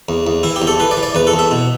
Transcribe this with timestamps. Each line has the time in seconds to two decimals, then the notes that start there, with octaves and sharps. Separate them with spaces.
0.09 E2
0.27 E2
0.43 E3 E4
0.56 G4
0.62 E2
0.67 A4
0.80 E3 B4
0.91 D5
0.97 E3
1.03 D5
1.15 E2 B4
1.27 A4
1.34 E2
1.39 E5
1.51 B2